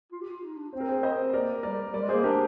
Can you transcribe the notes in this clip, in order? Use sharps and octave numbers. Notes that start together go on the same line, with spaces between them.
F4
G4
F4
D#4
D4
C4 C5
A#4
G#4 C5
C5 D#5
A#3 A#4 D5
G3 A#4 D5
G3 A#4 D5
G#3
G#4 C5
A#3
D4 G4 A#4